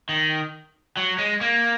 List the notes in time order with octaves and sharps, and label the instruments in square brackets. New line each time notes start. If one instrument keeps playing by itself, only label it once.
[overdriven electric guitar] D#3
F#3
G#3
A#3